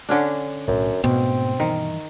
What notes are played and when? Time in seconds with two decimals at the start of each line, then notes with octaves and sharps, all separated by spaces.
0.09 D3 C#4 D4
0.67 B1 F#2 A2
1.04 G#2 B2 A3 B3 C4
1.60 G2 D#3 E3